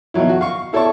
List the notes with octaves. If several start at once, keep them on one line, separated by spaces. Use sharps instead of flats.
B2 D#3 F3 F#3 E4
F#4
F5 C#6
E4 A4 C#5 D5 A5 C#6